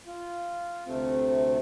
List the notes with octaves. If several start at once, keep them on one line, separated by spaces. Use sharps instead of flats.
F4
D2 C3 A3 C4